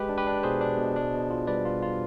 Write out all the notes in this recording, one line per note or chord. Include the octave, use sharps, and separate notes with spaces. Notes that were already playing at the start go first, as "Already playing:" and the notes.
Already playing: G#3 G4 B4
D4
G4 B4
D4
B2 G#4 C5
D4
B2
D4
B2
F4
G3 B4 D5
F4
F4